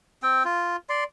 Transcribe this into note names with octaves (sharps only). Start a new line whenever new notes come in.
C4 G5
F4
D5 C6